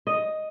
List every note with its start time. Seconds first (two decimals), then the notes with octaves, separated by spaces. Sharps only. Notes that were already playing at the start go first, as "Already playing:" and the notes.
0.07 D#5